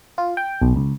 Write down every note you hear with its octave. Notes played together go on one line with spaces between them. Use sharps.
F4
G5
B1
C#2